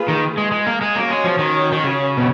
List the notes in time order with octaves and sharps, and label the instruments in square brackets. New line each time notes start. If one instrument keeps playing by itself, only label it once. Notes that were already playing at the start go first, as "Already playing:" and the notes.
Already playing: [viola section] A#3 F4 G#4 B4
[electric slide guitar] D#3
G#3
G#3
A#3
G#3
[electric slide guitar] A#3 [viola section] C#4 F#4 C#5
[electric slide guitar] G#3
F3
D#3
D#3
C#3
B2